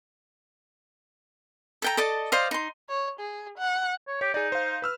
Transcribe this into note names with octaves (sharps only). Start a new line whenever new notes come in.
A4 G5 A#5
A4 D5 D#5 A5
C5 D5 D#5 F5
D#4 C6
C#5
G#4
F#5
C#5
G4 C#5
D#4 G#4 D5
C5 F5
B4 E6 F6